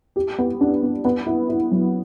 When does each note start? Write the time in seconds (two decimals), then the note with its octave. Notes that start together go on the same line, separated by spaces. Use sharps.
0.16 G4
0.38 B3
0.61 D4
0.82 B3
1.05 B3
1.26 E4
1.49 E4
1.71 F#3